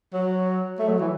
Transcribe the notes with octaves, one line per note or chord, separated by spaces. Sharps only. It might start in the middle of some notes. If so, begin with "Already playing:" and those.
F#3
A3
F#3
E3